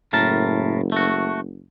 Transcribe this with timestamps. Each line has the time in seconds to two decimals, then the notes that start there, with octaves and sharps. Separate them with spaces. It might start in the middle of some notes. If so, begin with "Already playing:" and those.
0.13 F#1 A2 A#4 A5
0.92 A3 F#4